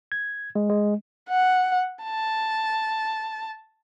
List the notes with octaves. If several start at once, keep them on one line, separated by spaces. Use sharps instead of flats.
G#6
G#3
G#3
F#5
A5